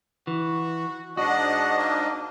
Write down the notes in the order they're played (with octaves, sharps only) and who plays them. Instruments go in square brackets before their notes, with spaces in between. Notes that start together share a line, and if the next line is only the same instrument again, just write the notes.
[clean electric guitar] E3 [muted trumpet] F#4
[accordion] G#2 D4 D#5 [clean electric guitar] F#4 [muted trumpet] F#5
[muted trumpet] A#3